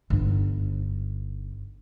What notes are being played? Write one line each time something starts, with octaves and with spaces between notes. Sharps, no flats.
G1 D#4